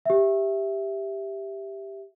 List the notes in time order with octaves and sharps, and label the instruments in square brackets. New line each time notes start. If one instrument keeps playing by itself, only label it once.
[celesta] G4 E5